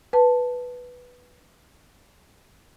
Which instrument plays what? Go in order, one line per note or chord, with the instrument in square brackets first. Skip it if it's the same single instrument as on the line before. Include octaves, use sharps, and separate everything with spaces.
[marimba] B4 A5